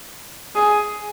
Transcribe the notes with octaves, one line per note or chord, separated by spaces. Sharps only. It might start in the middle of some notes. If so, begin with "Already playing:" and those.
G#4